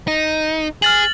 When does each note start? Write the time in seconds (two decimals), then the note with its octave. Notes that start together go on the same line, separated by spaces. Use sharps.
0.07 D#4
0.82 G#4 F6 A6 F#7